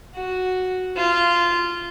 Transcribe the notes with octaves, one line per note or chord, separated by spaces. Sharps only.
F#4
F4